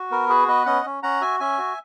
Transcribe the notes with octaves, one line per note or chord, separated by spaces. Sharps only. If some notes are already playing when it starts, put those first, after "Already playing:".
Already playing: F#4
B3 A#4
F#4 G#4 B4
B3 B4 D#5
C#4 D#5 F#5
C#4
C#4 F#5 A#5
F#4 E5 G#5
C#4 E5 G#5
F#4